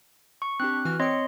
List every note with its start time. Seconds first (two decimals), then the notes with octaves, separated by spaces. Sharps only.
0.42 C#6
0.60 C4 D4 G4 F#6
0.85 E3 F#4 F6
1.00 C4 C#5 D#5 C6 C#7